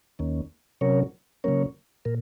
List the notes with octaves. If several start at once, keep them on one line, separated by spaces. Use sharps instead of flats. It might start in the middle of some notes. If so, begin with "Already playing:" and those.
D#2 D#3 A#3 C#4
C3 F#3 C#4 A#4 C#5
C#3 F#3 A#3 C#4 A#4 C#5
A#2 A#4